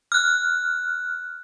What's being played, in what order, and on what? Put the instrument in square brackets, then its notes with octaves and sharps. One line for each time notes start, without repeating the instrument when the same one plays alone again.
[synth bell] F6 F#6